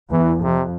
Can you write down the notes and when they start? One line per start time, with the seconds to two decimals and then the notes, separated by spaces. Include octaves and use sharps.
0.11 E2 E3
0.42 F2 C3